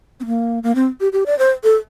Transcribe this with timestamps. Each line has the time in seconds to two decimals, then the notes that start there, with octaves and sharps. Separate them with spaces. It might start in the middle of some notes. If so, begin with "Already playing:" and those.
0.20 C4
0.26 A#3
0.63 A#3
0.75 C4
1.01 G4
1.13 G4
1.26 D5
1.39 C5
1.64 A4